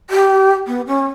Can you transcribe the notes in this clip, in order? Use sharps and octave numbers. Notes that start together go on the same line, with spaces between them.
G4
B3
C#4